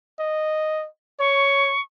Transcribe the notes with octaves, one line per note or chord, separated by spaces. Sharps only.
D#5
C#5 C#6